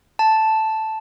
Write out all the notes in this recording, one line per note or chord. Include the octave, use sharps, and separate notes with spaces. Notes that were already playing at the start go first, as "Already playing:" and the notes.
A5